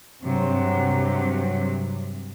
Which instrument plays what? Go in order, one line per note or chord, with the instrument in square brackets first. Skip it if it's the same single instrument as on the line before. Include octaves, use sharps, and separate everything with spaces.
[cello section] G2 C3 F#3